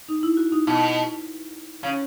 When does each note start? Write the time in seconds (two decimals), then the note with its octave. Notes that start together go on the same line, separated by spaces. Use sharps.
0.09 D#4
0.23 E4
0.37 F#4
0.52 D#4
0.67 B2 D#4
1.83 C#3 C#4